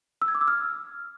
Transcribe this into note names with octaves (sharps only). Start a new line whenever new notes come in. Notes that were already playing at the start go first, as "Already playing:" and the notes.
E6
G#6
D6
E6
F6